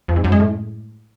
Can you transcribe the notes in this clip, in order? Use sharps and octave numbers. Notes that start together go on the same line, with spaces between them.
F2
G#2
F#2
G#3
A2